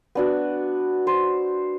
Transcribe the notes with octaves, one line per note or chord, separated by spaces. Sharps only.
B3 D4 F#4
C5